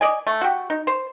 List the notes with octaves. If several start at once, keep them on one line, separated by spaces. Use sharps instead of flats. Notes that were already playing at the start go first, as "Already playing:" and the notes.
D5 D#5 G#5
A3
F#4 G4
D#4
C5